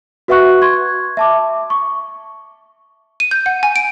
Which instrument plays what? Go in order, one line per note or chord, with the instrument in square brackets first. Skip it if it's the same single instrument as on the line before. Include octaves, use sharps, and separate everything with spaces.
[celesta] F#4 B4 E5 F#5 C#6 F#6
C6 C#6 G#6
E5 A5 D6
C#6
[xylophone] D#7
G6
F#5
G#5
D7